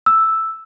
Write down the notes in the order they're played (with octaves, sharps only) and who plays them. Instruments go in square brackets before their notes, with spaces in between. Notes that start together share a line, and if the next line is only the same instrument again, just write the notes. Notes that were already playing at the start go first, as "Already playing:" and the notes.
[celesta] E6